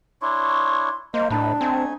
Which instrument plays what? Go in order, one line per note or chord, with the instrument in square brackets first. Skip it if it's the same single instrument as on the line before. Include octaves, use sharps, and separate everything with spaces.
[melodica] D4 E4 C#5 [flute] C6 [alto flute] C#6
[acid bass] A#3 [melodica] C5 [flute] D#5
[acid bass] A2 [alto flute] D4 [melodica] D#4 B4 [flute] A5
[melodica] A3 D#4 G#5 [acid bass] C4